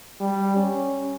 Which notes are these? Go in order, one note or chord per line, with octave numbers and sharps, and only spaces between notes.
G3
C#4